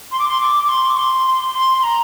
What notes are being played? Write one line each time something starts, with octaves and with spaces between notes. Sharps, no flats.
C6
D6
C6
D6
D6
C6
D6
C6
C6
C6
C6
A#5